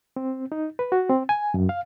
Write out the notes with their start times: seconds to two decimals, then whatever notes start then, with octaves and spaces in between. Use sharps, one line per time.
0.16 C4
0.52 D#4
0.79 B4
0.92 F#4
1.10 C4
1.29 G#5
1.54 F#2
1.69 F5